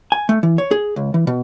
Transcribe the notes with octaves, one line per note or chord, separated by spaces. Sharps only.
G#5
A3
E3
C#5
G#4
C#2
E3
B2